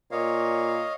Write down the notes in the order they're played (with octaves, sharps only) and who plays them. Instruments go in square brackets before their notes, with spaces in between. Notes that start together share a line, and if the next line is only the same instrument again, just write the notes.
[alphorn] A#2 [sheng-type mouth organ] C#5 D#5 F5